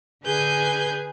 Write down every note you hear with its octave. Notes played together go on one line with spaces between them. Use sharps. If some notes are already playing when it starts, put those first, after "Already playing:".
D3 G#4 B4 G#5 G6